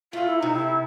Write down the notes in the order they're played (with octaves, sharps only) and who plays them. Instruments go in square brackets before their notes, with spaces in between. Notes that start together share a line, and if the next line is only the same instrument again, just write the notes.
[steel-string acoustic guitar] A3 [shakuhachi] F4
[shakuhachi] E4
[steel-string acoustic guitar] C3 [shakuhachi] D#4
[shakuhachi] E4